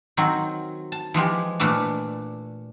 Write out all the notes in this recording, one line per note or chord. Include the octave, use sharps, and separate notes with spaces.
D#3 F#3 C4
A5
E3 F3 G#3 G4
A#2 E3 A3 D4